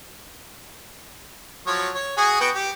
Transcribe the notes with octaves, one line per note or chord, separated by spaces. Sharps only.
F3 F#3 C#5
C#5
F#4 G#4 G#5
B3 F#4 G5
G4